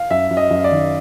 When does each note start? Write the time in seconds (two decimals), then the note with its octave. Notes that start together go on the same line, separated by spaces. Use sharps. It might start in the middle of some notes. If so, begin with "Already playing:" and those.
Already playing: F5
0.10 F#2 E5
0.30 F#2
0.37 D#5
0.50 F#2
0.64 D5
0.71 D#3